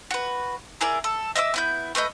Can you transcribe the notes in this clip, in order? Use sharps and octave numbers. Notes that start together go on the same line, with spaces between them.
F#4 B4
E4 G#4 A#4 D5
A4
D#5 E5 D6 E6
B3 E4 G6
A3 B4 D#5 G6